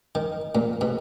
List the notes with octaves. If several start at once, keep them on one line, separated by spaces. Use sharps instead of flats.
D#3
A#2
B2